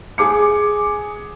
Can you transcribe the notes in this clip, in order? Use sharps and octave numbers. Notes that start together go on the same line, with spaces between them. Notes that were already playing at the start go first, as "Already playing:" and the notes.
G#4 D6 C#7